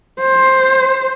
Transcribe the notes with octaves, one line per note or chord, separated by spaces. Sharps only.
C5